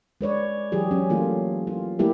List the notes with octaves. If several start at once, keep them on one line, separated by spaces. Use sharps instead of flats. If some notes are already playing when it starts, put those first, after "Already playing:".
G#3 B4 C#5 D5
E3 F#3 G4 G#4
F#3 C#4
E3 A3 A#3 F4
F4
G3 A3 A#3 E4 G4 A4